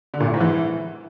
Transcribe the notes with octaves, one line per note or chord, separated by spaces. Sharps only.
D3
A#2
A2
G#2
E3